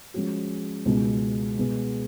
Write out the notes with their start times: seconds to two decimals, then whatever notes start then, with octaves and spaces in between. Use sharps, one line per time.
0.14 F3 G#3 C#4 F#4
0.85 C#2 B2 G#3
1.57 B2 G#3 B3